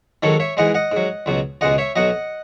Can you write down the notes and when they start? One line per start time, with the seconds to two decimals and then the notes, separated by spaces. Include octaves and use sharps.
0.23 G#2 D#3 F#3 A4 C#5
0.40 C#5 E5
0.57 G#2 E3 G#3 D#5 F#5
0.74 D#5 F#5
0.92 G#2 F#3
1.26 C#2 B2 F#3
1.61 C#2 B2 G#3 D#5 F#5
1.78 C#5 E5
1.96 B1 B2 F#3 D#5 F#5